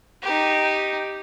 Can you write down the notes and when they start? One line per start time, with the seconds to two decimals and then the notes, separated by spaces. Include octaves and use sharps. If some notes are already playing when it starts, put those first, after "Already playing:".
0.22 D#4 G4